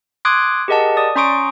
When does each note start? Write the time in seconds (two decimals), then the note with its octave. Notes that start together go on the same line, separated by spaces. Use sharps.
0.25 C6 D6 D#6 F#6 G#6 D7
0.68 G4 G#4 A#4 D#5 F#5 A5
0.97 D5 D#6
1.16 C#4 A#5 C6 C#6 D#6 D7